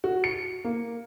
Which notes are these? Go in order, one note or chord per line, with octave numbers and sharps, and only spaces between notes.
F#4
C#7
A#3